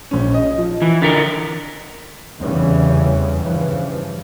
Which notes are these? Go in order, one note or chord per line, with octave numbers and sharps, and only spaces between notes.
A#1 C#4
D#5
F3
E3
D3 A#4 A6 B6 C#7
F1 E2 C#3 E3 G3 C#4
G2 C#3 E3 F3